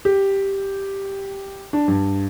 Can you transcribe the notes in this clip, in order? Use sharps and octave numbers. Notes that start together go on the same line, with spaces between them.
G4
D4
G2